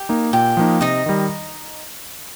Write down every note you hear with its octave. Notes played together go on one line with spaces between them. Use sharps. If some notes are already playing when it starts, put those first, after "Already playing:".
Already playing: G4
A#3 D#4
A#2 G4
F3 A#3 D#4
C3 D#4 D#5
D#3 G3